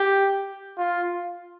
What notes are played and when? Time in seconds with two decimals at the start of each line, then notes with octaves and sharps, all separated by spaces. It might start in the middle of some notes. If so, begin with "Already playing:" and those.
Already playing: G4
0.78 F4